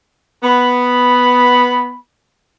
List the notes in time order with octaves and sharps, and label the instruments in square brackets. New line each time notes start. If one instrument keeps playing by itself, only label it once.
[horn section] B3 B5